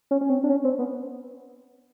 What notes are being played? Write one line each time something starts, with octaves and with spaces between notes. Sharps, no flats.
C#4
C#4
C4
D4
C#4
C4
B3